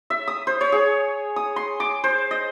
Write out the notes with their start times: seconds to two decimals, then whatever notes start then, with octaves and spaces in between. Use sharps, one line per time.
0.10 E5
0.27 D#6
0.47 C5
0.61 C#5
0.72 G#4
1.36 D#6
1.56 C6
1.80 D6
2.04 C5
2.31 D#5